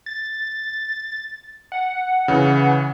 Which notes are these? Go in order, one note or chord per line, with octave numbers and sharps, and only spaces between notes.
A6
F#5
C#3 E3